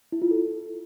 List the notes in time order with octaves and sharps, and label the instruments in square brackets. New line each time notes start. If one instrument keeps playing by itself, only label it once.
[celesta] E4
F4
A4